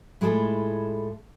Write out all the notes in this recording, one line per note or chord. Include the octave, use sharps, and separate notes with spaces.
A2 G#3 E4 F4 G#4 A4